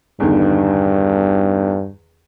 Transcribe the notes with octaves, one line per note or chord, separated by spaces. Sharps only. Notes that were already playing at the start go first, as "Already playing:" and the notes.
E2 G2 D3 D#3